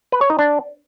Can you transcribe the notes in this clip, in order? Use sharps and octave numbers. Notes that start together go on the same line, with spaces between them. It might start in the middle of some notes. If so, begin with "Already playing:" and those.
B4
C#5
D#4
D4